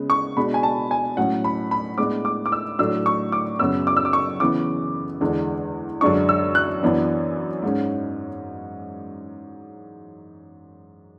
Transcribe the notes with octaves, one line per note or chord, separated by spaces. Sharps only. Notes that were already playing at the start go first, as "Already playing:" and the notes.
Already playing: C#3 G#3 B3
C#6
B2 G#3 D4 B5
G#5
A5
G#5
A2 F#3 C#4 F#5
B5
B5
A2 G#3 B3 D4 D6
D6
D6
E6
A2 F#3 A3 D4 E6
C#6
D6
F#2 C#3 F#3 B3 E6
D6
E6
D6
C#6
C#3 E3 B3 D6
E2 D3 G#3
F#2 D3 G#3 D4 C#6
E6
F#6
F#2 E3 B3 D4
G#2 G#3 C#4